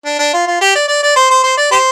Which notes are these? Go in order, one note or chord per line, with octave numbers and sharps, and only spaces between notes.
D4
D4
F4
F4
G4
D5
D5
D5
C5
C5
C5
D5
G4 C5